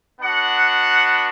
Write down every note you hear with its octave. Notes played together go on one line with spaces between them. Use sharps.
B3 D4 F#4 F#5